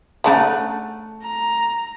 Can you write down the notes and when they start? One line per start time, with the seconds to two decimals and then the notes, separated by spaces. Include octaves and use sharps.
0.24 C#3 A3 D4 D#4 F#5
1.23 A#5